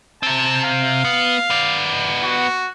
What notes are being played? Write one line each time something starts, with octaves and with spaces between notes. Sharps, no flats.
C3 C4 A5
F5
B3
B3 D5
F#4